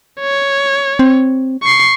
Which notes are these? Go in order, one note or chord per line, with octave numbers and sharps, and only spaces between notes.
C#5
C4
C#6 C7